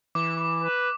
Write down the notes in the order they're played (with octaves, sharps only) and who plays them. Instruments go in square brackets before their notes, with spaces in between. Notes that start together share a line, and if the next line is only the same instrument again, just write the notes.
[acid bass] E3 [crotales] D6
[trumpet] B4